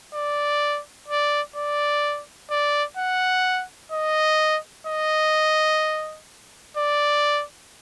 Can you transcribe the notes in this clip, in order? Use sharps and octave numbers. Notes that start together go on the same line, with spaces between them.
D5
D5
D5
D5
F#5
D#5
D#5
D5